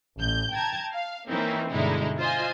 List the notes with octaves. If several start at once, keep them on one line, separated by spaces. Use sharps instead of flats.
A1 G6
G5 A5 A#5 G#6
F5
E3 A#3 C4 C#4 D#4 E4
G2 B2 D3 G#3 D#4 E4
F4 C5 D#5 G#5